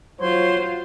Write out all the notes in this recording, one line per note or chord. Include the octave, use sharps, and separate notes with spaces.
F#3 F4 C5 C#5 C6 G#6